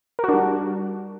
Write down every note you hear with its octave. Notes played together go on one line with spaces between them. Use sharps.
G3 D4 F#4 A#4